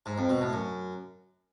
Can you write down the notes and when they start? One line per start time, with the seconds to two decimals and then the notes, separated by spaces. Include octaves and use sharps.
0.06 G#2
0.18 F2
0.30 B2
0.41 A2
0.53 F#2